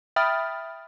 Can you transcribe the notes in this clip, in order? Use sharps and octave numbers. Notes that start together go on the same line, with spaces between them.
E5 G5 B5 D#6 F6 A6